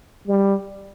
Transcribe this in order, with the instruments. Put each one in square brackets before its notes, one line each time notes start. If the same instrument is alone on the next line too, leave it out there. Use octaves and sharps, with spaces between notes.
[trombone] G3